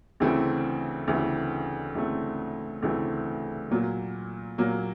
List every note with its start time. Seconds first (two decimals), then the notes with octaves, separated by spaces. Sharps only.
0.20 D2 C#3 E3 A3 C4
1.08 D2 C#3 E3 A3 C4
1.95 D2 C#3 E3 A3 C4
2.82 D2 C#3 E3 A3 C4
3.71 A#2 F#3 A#3
4.58 A#2 F#3 A#3